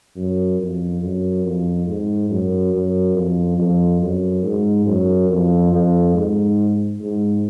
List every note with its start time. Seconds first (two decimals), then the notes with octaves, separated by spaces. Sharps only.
0.16 F#2
0.59 F2
1.01 F#2
1.44 F2
1.87 G#2
2.30 F#2
2.73 F#2
3.15 F2
3.58 F2
4.01 F#2
4.43 G#2
4.86 F#2
5.29 F2
5.72 F2
6.14 G#2
7.00 G#2